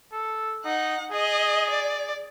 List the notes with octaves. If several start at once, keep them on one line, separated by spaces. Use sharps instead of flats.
A4
D#4 F#5
G#4 D#5
D5